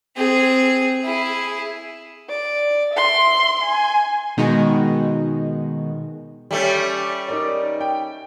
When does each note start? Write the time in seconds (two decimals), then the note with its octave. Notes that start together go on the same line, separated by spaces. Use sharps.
0.16 C4 G#4
1.04 E4 G#4
2.29 D5
2.93 E5 C6
3.64 G#5
4.37 B2 D#3 G#3 D#4 F#4
6.51 G3 A3 C#4
7.28 D#4 A#4 D5
7.81 G5